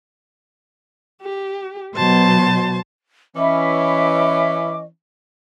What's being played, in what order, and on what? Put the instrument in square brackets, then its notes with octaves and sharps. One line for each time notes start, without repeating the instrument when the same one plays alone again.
[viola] G4
[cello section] B2 F#3 [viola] C5 A5
[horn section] E3 C#4 [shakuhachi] D#5 [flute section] E5 B5 [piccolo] D6